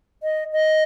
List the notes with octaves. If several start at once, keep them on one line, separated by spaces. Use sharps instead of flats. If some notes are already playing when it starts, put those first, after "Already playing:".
D#5
D#5